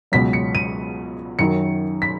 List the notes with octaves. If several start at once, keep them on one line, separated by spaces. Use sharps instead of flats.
C#2 B2 F#3 B6
C#7
D#7
F#2 D#3 F#3 C#7
B6